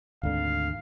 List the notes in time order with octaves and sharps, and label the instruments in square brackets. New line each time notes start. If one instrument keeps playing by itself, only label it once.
[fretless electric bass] G#1 D3 [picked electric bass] D2 [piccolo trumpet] F5